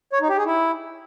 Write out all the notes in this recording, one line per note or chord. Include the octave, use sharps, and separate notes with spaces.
C#5
D#4
G4
G#4
E4